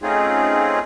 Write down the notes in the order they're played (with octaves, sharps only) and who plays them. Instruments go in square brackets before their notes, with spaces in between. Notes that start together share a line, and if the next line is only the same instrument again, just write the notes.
[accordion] A3 C4 C#4 D#4 F4 G#4